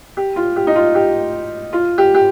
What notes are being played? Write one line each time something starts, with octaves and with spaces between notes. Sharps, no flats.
G4
F4
G4
D#4
F4
G4
F4
G4
G4